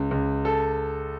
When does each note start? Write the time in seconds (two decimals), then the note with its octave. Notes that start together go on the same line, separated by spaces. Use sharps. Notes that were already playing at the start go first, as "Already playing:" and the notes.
Already playing: C#2
0.11 C#2
0.45 A4